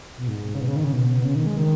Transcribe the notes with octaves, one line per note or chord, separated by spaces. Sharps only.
B2
G#2
C#3
B2
C#3
D#3
C#3
B2
B2
C#3
D#3
G#3
D#3